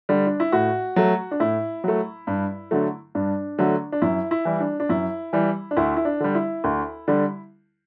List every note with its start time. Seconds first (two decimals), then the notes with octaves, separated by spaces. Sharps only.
0.09 D3 G3
0.27 D4
0.40 E4
0.52 A2 F#4
0.96 F#3 A3
1.31 D4
1.40 A2 E4
1.84 F#3 A3
2.27 G2
2.71 D3 F#3 A3
3.15 G2 D4
3.59 D3 F#3 A3
3.92 D4
4.02 F#2 E4
4.31 E4
4.45 E3 G3
4.60 D4
4.80 D4
4.89 F#2 E4
5.33 E3 G3
5.71 D4
5.77 D2 E4
5.97 E4
6.05 D4
6.20 D3 G3
6.35 E4
6.64 D2
7.08 D3 G3